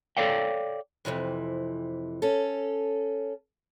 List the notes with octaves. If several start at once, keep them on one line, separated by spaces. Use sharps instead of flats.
A4 A#4 C#5 D5 F5 G5
F2 G#2 C3 E3
C#4 A4